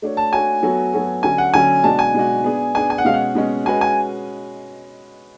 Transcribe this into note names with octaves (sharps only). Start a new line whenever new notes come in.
A3 D4 F#4 C#5
A5
A3 D4 F#4 C#5 G#5
F#3 B3 F#4 A4 C#5
F#3 B3 F#4 A4 C#5
D3 F#3 C#4 G#5
F#5
D3 F#3 C#4 G#5
B2 G#3 D4 F#4 A5
G#5
B2 G#3 D4 F#4
B3 D4 G#4
B3 D4 G#4 G#5
G#5
F#5
B2 G#3 C#4 F5
F#5
B2 G#3 C#4
G#3 C#4 F#4 B4 G#5
G#5